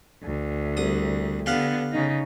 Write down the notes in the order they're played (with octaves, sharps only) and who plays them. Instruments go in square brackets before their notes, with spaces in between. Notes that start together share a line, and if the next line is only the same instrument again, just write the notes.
[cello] D2
[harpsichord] C2 D#6
[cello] D3 B3 [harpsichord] G4 F5 F#5
[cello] C#3 D#4